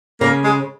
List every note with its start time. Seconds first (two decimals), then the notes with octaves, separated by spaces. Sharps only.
0.21 C#3 A#3
0.45 G#3